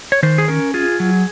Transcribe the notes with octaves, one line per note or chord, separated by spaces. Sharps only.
C#5
D#3 C5
G#4
C#4 A#4
F4 G#4
F#3